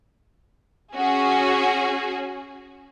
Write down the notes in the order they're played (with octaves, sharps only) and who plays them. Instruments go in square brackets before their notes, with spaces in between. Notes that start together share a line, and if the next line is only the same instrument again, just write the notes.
[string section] C#4 F#4 G#4